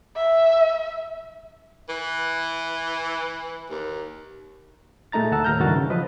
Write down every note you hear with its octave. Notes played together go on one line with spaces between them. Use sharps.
E5
E3
D#2
A#2 G#3 A3 D#4 A#5 A6
D2 F#5 A5 E6
D#2 A2 A#5 F6 G6
C#2 G2 D#3 E3 F#4 A6
C#3
F3 B4 D#5